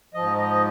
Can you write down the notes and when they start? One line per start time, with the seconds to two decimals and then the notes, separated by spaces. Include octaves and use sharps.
0.14 G#2 F3 D#5
0.38 D#5